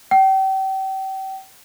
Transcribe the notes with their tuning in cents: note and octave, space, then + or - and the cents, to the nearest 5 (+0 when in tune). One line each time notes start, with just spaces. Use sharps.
G5 -35